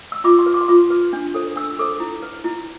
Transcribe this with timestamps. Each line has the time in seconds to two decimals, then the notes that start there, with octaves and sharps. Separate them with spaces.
0.12 E6
0.24 F4 D6
0.39 C6
0.46 B4
0.54 D6
0.61 C6
0.68 F4 D6
0.90 B4
1.13 D4
1.34 A4 C5
1.56 D4 E6
1.79 A4 C5 D6
2.00 E4
2.23 B4
2.44 E4